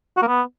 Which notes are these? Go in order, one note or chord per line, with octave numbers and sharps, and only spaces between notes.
F#4
A#3
B3